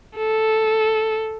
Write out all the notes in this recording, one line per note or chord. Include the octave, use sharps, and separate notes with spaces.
A4